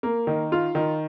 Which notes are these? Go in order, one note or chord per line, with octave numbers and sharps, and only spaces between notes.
A#3
D#3
F4
D#3